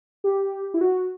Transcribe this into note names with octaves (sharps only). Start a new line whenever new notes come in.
G4
E4
F#4